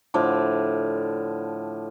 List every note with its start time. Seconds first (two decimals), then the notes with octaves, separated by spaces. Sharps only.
0.14 A2 D3 F3 D6